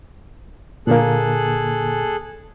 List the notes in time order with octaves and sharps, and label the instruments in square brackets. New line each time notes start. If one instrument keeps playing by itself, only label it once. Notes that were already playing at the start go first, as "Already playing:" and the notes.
[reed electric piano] A#2 D3 A#3 [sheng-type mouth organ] G#4 A4 F#6